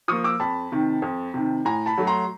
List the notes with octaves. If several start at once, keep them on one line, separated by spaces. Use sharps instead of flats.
F3 A#3 C#6 D#6
D6 E6
F2 A5 B5
C3 D#3
F2
C3 D#3
A2 G#5 A#5
A5 B5
F#3 A3
A#5 C6